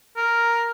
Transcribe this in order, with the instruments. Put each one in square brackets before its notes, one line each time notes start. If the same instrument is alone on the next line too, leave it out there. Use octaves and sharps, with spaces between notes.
[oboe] A#4